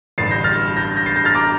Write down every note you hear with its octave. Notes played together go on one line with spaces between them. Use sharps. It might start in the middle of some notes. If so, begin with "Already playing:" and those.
A1 G2 D3 A6 C7
G6 A#6
F6 A6
G6 A#6
G6 A#6
A6 C7
G6 A#6
F6 A6
A#5 D6